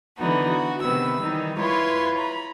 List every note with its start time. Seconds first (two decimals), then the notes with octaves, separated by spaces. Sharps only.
0.16 D3 E3 B3 D#4 F#4
0.49 F#4
0.81 C3 D#3 B3 B4 E6
1.21 D#3 E3 G3 D#4
1.58 E4 F4 B4 C#5 C6
2.17 A#5 B5